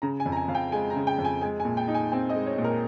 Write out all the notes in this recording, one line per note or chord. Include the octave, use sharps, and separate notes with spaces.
C#3 A#5
G#5
F2
A#5
G#5
F2 F5
G5
G#3 G#5
A#5
C#3
G5
F2
G#5
G#3 G#5
G#5
A#2
G5
D#4
G#5
C4 G5
D#5
G#3
C#5
A#2
A#4